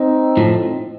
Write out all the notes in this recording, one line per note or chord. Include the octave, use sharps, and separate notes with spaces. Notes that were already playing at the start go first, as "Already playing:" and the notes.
Already playing: C4 D#4
A2 F3